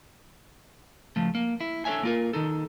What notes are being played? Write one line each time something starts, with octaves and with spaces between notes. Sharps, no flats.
C#2 F3 A3
A#3
E4
D4 A4 A#4 C#5 E5 G#5
A#3 F4 A#4
D#3 D#4 A4